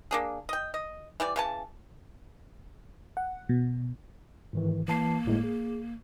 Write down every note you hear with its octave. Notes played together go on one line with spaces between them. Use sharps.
A#3 D4 G#4
D#5 G5
D#5
E3 G3 D5
C#3 E3 A5
F#5
B2
G#2 D#3 E3
E3 A#3 A5 C7
G1 A2 G#3
G#4